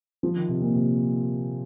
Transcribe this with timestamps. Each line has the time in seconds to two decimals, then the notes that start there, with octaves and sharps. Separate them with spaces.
0.23 F3
0.36 D#3
0.48 C3
0.62 A#2
0.75 C3